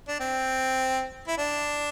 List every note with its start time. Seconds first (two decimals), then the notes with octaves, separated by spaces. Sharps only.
0.08 D4
0.20 C4
1.28 E4
1.38 D4